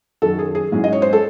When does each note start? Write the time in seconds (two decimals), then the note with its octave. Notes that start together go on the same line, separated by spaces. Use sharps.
0.22 F#2 D#3 F#3 A4
0.39 G#4
0.55 G#4
0.72 G#2 F#3 C#4 E4
0.84 D#5
0.93 C#5
1.02 C5
1.13 A4